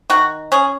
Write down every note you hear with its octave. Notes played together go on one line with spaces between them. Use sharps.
D#3 F#4
C#4 G#4